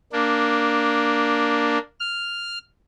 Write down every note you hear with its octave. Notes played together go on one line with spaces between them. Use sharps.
A#3 D4
F6